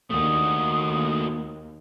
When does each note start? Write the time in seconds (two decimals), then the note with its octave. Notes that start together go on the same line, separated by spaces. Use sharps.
0.10 D#2 A3 F#4 D#6